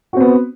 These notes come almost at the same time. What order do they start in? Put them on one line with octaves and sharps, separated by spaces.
F#4 C4 B3